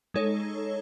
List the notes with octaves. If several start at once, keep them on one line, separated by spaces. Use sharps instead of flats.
G#3 D#4 A4 C#5